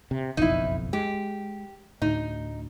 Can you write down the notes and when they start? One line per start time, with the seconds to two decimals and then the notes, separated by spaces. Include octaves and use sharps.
0.11 C3
0.37 F#1 B1 F2 D#4 E4
0.93 G#3 G4
2.02 D2 A2 D#4